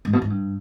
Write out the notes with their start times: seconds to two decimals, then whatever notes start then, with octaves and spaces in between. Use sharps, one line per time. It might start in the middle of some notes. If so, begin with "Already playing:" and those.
0.05 G#2
0.13 B2
0.22 G#2
0.30 G2